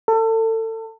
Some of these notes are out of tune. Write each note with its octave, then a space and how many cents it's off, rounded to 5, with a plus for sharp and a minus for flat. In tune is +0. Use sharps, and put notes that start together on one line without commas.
A4 +30